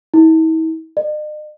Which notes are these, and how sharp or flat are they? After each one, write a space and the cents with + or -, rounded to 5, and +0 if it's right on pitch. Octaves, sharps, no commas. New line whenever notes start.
E4 -45
D#5 -45